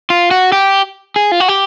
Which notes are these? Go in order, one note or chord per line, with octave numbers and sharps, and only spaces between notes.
F4
F#4
G4
G#4
F4
F#4
G4